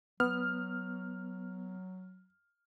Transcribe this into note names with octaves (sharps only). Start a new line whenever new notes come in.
F#3 B3 F6